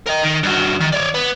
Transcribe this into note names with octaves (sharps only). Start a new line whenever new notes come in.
A#4 D#5
D#3
G2 F#3
D#3
C#5 D5
B3